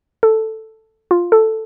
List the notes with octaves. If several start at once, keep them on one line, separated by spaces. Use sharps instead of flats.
A4
F4
A4